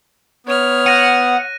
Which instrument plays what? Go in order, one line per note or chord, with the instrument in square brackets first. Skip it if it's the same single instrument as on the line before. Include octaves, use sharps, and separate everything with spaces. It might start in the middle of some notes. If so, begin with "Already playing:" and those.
[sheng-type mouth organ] B3 [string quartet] C#5 F6
[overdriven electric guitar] F#5 [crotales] F#6 A#6 D#7